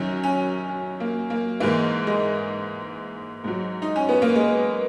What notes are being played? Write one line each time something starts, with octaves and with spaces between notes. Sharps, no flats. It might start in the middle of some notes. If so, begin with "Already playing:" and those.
Already playing: F#2 D#3 F#3 C#4
C#4
C#4
A#3
A#3
G#2 E3 A#3
G#3
G#2 F#3
D#4
C#4
B3
A#3
G#3